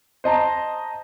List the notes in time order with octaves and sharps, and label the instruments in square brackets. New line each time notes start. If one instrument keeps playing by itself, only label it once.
[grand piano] C5 D#5 A5 A#5